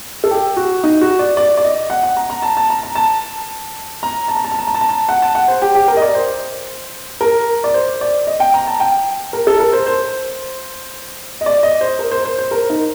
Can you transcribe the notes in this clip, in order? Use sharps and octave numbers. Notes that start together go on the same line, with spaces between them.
A4
G4
F#4
D#4
F#4
D5
D5
D5
D#5
F#5
F#5
A#5
A#5
A5
A5
A#5
A#5
A5
A#5
A5
A#5
A5
A#5
A5
A#5
A5
A#5
A5
F#5
A5
F#5
C5
G4
G4
A#4
D#5
D5
C5
A#4
D5
C5
D5
D#5
G5
A#5
A5
G5
A#4
A4
A#4
C5
C5
D#5
D5
D#5
C5
A#4
C5
C5
C5
A#4
D#4